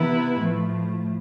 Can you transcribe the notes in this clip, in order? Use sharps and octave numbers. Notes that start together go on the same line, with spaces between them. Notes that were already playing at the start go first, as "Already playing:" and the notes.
Already playing: C3 E3 B3 E4 B4
A2 F3 A3